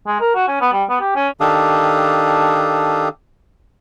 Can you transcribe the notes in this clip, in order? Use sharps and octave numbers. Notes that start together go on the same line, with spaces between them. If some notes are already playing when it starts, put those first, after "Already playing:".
G#3
A#4
F#4
C#4
B3
G3
B3
G4
C#4
D#3 D4 G4 A4 F5 D#6